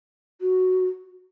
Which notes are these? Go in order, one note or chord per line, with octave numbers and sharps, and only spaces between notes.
F#4